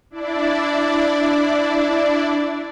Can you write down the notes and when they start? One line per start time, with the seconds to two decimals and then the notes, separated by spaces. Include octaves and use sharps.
0.10 D4 E4 D5